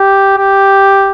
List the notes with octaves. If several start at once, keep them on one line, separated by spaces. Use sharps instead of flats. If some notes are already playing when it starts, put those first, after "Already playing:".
Already playing: G4
G4